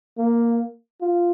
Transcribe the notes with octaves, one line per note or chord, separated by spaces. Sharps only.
A#3
F4